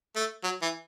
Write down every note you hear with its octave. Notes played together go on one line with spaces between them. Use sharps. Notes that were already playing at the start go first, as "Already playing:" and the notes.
A3
F#3
E3